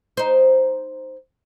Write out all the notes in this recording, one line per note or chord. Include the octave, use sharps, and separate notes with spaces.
D#4 C5